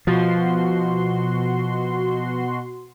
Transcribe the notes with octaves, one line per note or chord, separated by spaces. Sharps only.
B2 F3 F#4 C6